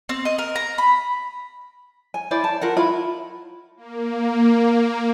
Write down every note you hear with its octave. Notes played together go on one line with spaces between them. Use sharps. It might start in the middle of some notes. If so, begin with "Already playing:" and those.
C4
D#5
A#4
A#5
B5
G#5
E4 C5 D5
A5
F4 A#4 F#5
E4 F4 B5
A#3